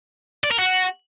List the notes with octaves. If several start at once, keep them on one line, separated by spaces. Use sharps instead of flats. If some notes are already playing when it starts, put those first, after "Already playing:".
D5
A#4
F#4